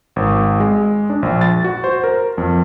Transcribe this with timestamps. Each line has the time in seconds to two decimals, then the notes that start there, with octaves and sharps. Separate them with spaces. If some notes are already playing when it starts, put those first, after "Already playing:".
0.16 G#1
0.60 G#3
1.10 D4
1.23 A#1
1.41 A6
1.64 F#4
1.84 C5
2.04 A#4
2.38 F2